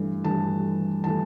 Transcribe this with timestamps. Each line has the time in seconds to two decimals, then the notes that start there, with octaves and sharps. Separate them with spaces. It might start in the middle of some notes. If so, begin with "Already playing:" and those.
Already playing: G2 E3 A3
0.23 G2 E3 A3 A5
1.04 E3 A3 A5